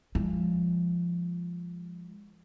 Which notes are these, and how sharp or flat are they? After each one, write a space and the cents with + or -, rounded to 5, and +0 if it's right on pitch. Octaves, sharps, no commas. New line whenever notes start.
F3 -10 G#3 -25